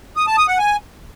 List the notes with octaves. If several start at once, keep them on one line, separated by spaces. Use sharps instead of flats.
D#6
A5
D#6
F#5
G#5